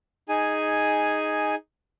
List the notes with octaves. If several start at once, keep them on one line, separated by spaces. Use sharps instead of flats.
D#4 G#4 G#5